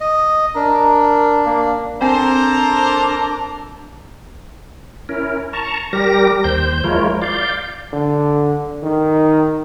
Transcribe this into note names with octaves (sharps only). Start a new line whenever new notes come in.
D#5
D4 A#4
A#3
C4 D4 A4 A#4 C5 G#5 A#5
C#4 E4 A#4
A5 A#5 C#6
G3 G4 A#4 A#6
D#2 C5 G6
F3 G#3 E4 F4 A#4 C#5
D5 F5 G6
D3
D#3